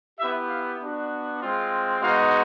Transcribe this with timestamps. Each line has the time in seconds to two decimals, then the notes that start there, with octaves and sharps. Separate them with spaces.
0.19 B3 E4 G4 E5
0.49 F5
0.80 B3 D4 F#4
1.41 G#3 C4 F4
2.01 G#3 B3 D#4 F#4 F5